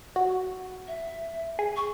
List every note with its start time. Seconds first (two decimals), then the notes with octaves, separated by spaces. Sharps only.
0.16 F#4
0.88 E5
1.59 G#4
1.77 C#6